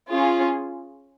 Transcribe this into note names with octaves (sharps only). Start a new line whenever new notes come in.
C#4 F4 G#4